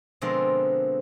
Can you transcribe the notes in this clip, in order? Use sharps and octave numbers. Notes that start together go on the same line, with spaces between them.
B2 D3 F3 G#3 C4 A#4